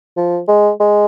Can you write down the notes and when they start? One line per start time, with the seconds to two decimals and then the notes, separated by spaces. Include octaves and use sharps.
0.17 F3
0.48 G#3
0.80 G#3